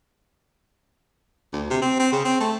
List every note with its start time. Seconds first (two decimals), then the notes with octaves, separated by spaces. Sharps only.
1.53 D2
1.70 C3
1.82 C4
1.99 C4
2.12 C#3
2.25 C4
2.41 A3